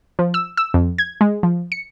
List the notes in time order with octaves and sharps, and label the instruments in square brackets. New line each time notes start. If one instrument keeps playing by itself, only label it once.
[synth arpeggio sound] F3
E6
E6
F2
G#6
G#3
F3
C#7